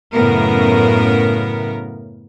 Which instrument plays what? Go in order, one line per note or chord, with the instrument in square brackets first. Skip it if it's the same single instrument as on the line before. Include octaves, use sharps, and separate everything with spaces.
[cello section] F#2 A2 C#3 B3 A#4